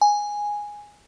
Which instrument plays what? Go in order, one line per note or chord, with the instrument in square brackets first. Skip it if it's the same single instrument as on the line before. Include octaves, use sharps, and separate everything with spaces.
[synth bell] G#5